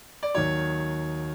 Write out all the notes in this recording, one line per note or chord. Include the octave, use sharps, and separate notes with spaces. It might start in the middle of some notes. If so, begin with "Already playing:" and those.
D5
D#2 D#3 F#3 C#5